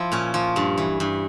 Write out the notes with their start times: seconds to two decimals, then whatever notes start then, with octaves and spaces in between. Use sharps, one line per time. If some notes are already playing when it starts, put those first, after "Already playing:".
Already playing: F3 E4
0.12 A#2 C#4
0.34 F3
0.56 G2
0.78 E3
1.00 G2